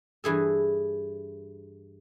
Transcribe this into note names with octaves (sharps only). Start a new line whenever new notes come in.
G2 E3 G#4 A4